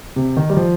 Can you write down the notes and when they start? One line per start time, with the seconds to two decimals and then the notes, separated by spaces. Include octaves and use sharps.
0.16 C3
0.36 D#3
0.50 G3
0.57 F3